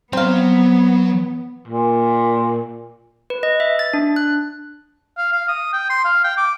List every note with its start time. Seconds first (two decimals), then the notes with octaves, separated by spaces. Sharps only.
0.13 F#3 B3 C4 F5 A#5
1.67 A#2
3.30 B4
3.43 D#5
3.60 E5
3.79 A6
3.94 D4
4.16 F#6
5.17 F5
5.33 F5
5.48 D#6
5.73 G5
5.90 C6
6.05 F5
6.24 G5
6.37 D6